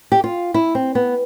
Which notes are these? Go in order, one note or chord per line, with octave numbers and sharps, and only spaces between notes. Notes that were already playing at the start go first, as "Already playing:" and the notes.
G4
F4
E4
C4
B3